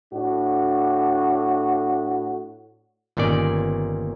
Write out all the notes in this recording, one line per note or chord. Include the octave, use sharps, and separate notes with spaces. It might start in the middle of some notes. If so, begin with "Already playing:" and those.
A2 D4 F#4
G1 A#2 D#3 C#4 D5